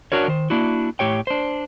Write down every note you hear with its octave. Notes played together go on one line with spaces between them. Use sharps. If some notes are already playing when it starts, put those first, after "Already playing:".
D4 F#4 A#4 C#5
D#3 C5
A#3 D4 E4 F#4
A2 G4 C#5 G5
D4 C5